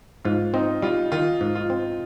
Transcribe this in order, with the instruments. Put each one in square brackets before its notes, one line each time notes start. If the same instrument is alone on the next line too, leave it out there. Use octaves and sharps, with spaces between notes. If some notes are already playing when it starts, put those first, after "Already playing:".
[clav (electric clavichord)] G#2 [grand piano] F4
[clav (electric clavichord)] C4 [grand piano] D#4
[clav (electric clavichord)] G3 [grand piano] F4
[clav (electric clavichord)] D#3 [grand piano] F4
[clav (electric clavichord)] G#2
[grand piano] F4
[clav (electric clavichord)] C4